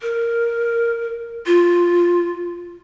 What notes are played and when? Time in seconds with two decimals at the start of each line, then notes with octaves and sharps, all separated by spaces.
0.02 A#4
1.46 F4